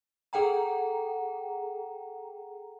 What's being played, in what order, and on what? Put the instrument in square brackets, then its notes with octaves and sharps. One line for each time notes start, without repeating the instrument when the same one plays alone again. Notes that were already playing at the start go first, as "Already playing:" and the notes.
[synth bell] G#4 A4 F#5 G5 A#5